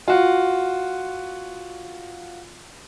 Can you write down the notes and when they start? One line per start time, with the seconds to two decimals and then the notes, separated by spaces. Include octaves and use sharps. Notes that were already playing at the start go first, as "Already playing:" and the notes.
0.08 F4 F#4